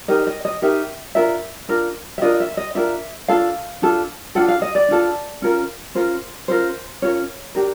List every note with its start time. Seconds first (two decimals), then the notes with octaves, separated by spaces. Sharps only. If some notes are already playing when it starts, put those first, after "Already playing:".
0.08 D#4 G4 A#4 D#5
0.27 D#5
0.45 D#5
0.62 D#4 G4 A#4 E5
1.15 D4 F4 A#4 E5
1.69 D4 F4 A#4
2.18 E5
2.22 D4 F4 A#4 D#5
2.40 E5
2.57 D#5
2.75 D4 F4 A#4 E5
3.28 D4 F4 A4 F5
3.82 D4 F4 A4
4.35 D4 F4 A4 F#5
4.49 F5
4.62 D#5
4.75 D5
4.89 D4 F4 A4
5.42 C#4 F4 A#4
5.95 C#4 F4 A#4 C5
6.48 C#4 F4 A#4 C5
7.02 C#4 F4 A#4 C#5
7.55 D4 G4 A#4